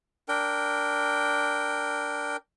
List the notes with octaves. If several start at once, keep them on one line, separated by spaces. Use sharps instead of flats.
D4 A#4 G5